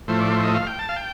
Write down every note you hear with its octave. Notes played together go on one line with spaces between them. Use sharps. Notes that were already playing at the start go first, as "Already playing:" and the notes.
A2 F3 A3 C5
D5
C5
D#5
F5
G5
A5
F5
G5